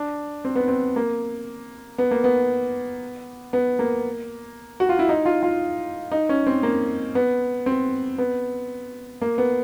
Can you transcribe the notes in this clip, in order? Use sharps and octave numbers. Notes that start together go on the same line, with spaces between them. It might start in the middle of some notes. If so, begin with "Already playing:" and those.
Already playing: D4
C4
B3
C4
A#3
B3
A#3
B3
B3
A#3
F#4
F4
E4
D#4
F4
F4
D#4
C#4
C4
A#3
B3
C4
B3
A#3
B3